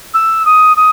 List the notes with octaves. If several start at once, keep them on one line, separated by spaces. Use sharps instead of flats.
E6
D#6
D#6